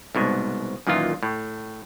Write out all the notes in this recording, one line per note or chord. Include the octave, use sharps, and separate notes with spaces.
C2 G#2 B2
F#2 A#2 D#3 E3 F4
A2